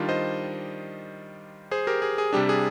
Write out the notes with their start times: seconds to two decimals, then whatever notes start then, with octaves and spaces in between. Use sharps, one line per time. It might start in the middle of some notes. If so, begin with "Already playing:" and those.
Already playing: D#3 G3 D4 F4
0.09 C5 D#5
1.71 G#4 C5
1.87 G4 A#4
2.02 G#4
2.18 G#4
2.33 C3 G3 D4 G4
2.49 G#4